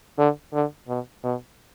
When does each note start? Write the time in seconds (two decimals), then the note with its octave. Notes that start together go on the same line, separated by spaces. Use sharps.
0.18 D3
0.53 D3
0.88 B2
1.24 B2